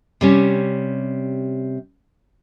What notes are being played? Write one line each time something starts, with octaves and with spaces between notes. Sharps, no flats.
C3 G3 C#4